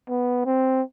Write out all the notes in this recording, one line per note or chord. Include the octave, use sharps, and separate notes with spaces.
B3
C4